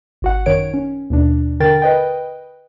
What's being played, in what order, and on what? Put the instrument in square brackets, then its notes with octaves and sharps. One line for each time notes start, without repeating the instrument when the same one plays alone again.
[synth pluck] G#1 F#4 F#5
F#2 D#3 C#5 D7
C#4
D#2 B2 D4
D3 A#4 G5 A6
B4 D#5 G5